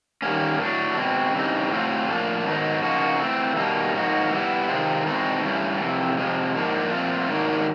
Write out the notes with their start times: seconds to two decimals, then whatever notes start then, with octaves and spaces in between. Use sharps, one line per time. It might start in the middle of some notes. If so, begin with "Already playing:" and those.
0.22 D#3 G3 A#3 C#4
0.59 A2 F#3 A3 D4
0.97 B2 G#3 C4
1.34 C#3 E3 G3 C4 D#4
1.71 A2 F#3 A3 C4 F4
2.08 A2 F3 A#3 D4 F4
2.45 G#2 D#3 F#3 B3 D#4
2.82 C#3 F3 A#3 D#4 F#4
3.20 E3 A3 C4
3.56 B2 G3 A#3 D#4
3.94 G#2 F3 A#3 D#4 F#4
4.31 E3 G3 B3 E4
4.69 C3 D#3 G#3 C4 F4
5.06 E2 B2 G#3 C4 D#4
5.43 G2 E3 A3 C#4
5.80 F2 C3 E3
6.17 F2 C3 F3 G#3
6.54 G#2 F3 A#3 D4
6.91 A#2 F3 A3 C4 F4
7.28 G#2 D#3 F#3 A#3 D4